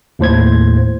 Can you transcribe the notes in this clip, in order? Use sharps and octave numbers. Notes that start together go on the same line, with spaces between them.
D#2 A2 C5 G#6